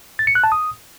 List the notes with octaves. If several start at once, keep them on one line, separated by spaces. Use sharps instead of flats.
A6
C#7
F#6
A5
D#6